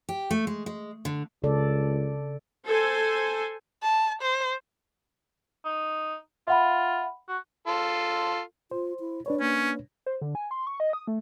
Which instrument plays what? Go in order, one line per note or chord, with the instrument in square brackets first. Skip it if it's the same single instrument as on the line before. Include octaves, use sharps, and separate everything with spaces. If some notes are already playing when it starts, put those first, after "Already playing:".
[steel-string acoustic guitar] G4
A3
G#3
G#3
D3
[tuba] C#2 [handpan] C#3 A4 D5
[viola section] A4 C5 G#5
[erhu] A5
C5
[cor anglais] D#4
[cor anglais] F4 [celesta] E5 F#5 B5
[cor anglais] F#4
[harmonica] F4 A4
[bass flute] F4 [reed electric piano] C5
[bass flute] E4
[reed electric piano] D4 B4 C#5 [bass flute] D5
[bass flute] A#3 [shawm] C#4
[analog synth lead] C5
D3
G#5
C6
C#6
D#5
D#6
A3